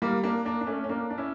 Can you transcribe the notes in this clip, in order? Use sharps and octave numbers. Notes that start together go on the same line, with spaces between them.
G3 A#3
A#3 D4
A#3 D4
D4
A3 C#4
C#4
A#3 D4
D4
C#4 E4